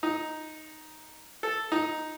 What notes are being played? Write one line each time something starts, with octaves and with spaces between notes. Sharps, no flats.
D#4
A4
D#4